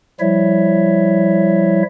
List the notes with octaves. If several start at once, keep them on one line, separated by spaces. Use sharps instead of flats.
F3 G3 E4 C#5 E5